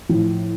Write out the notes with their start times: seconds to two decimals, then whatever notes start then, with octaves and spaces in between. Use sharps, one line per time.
0.09 A2 F3